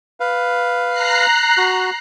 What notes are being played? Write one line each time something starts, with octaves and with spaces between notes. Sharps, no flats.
B4 F5
A#5 F#6 C7
F#4